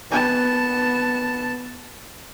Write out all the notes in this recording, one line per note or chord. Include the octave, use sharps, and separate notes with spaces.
B3 A5